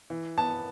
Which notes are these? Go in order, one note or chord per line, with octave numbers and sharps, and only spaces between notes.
E3
B3 A5